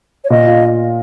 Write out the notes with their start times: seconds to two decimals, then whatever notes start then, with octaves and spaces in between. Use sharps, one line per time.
0.24 C#5
0.30 A#2 D#5
0.47 F4